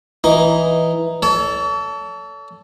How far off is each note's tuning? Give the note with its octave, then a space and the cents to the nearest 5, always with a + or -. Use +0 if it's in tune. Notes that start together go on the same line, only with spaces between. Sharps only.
E3 +0 D#4 +0 A#5 +0
A4 +0 C#5 +45 A5 +0